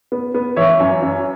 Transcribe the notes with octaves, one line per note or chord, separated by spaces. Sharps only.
B3
B3
E3 C#5 E5
F#2
F#2